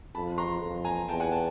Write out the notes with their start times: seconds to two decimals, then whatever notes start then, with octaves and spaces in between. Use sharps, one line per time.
0.15 F2 A5 B5
0.38 A#5 C6
0.62 F2
0.84 G#5 A#5
1.08 E2 G5 A5
1.20 F#5 G#5
1.31 G5 A5